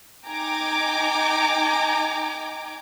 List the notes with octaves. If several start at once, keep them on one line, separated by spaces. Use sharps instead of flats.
D#4 G5 G#5 A#5 D6